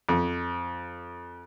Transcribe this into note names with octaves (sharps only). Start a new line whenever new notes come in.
F2